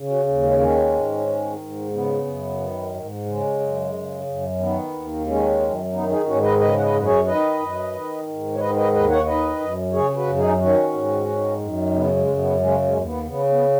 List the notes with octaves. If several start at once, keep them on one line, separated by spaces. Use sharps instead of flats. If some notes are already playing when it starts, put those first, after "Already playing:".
Already playing: C#3
C#4 F#4
D#2
G#3 C#4
D#3 G#3 C#4
G#2
D#3
G#2
C#3 B3
F#2
D#3
G#2
C#3 G#3
F#2
C#3
F#2
D#3 B3
D#2
D#3 G#3 C#4
F#2
D#3 B3 D#4
D#4 G#4
G#2 C#4 F#4
B4 D#5
C#3 B4 D#5
F#5
B4 D#5
F#2
B4
G#4 C#5
D#3 B4 D#5
F#2
D#3
G#2
C#5
D#3 B4 D#5
B4 D#5
D#2 B4 D#5
C#5 F#5
D#3 B4 D#5
F#2
C#3 G#4 C#5
G#4
F#4 B4
F#2
D#4 G#4
D#3 C#4 F#4
G#2
D#3
F#2
C#3 B3
G#3
F#2
B3
C#3 G#3 C#4
G#3 C#4
D#2
B3
C#3 B3
B3